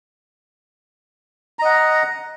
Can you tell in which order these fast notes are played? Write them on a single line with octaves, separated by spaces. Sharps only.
A#5 D#5 F#5